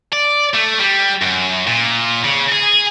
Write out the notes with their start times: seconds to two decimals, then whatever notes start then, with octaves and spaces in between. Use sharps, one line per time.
0.13 D5
0.55 A3
0.80 G3
1.22 F#2
1.67 A#2
2.24 C#3
2.53 G#4